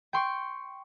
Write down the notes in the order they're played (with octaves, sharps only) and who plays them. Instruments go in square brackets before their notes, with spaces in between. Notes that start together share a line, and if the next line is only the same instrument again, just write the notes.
[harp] G5 C6 C#6